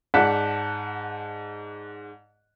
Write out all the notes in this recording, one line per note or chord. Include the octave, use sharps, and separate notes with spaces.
G#2 D5 F#5 A5 F#6 B6